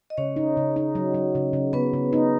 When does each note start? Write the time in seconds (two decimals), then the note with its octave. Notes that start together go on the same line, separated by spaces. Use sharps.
0.10 D#5
0.17 C#3 C#4 C#5
0.36 D#4
0.57 C#3
0.76 D#4
0.95 F#3
1.14 F#3
1.35 C#3
1.53 C#3
1.73 C#3 B3 B4
1.93 C#3
2.13 D#4